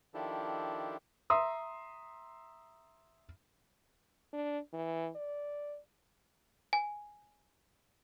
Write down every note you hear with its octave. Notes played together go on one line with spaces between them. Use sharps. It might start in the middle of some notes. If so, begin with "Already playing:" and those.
D#3 F3 D4 E4 G4 A4
E5 A#5 C6 D#6
D4
E3
D5
G#5